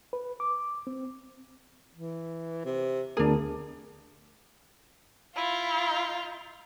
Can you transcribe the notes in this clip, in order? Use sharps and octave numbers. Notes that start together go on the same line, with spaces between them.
B4
D6
C4
E3
C3
D2 A3 B3 D4 G#4 A#4
E4 F4